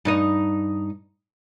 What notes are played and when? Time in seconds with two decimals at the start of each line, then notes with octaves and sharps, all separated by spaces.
0.05 G2 D#4 D#5